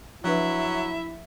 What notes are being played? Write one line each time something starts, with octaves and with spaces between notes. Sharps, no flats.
F3 F#3 D4 E4 B4 E5